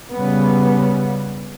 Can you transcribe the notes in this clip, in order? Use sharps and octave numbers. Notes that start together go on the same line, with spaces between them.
C#3 G3 B3